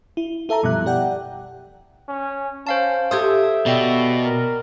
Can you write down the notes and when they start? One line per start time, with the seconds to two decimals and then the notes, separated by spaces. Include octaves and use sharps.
0.17 E4
0.49 E4 A4 E5 A5 A#5
0.63 F#2 B2 F3 G3 E5 F#6
0.86 G4 D5 F#5 G5
2.08 C#4
2.67 C#4 C5 F5 A5
3.11 G4 A4 C5 E5 D#6 G6 G#6
3.66 B2 D5 D#5 G5
4.24 A#4